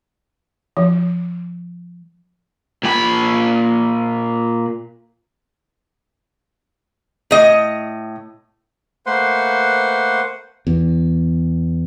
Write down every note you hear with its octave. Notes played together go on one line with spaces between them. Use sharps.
F3
A#2 B5
A2 D#5
A3 A#3 B4 C5 F#5 C6
E2